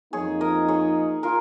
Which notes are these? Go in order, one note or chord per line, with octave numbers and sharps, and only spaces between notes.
F2 F3 A#3 D#4 G#4 C#5
A#4 D#5
G#4 C#5
F4 A#4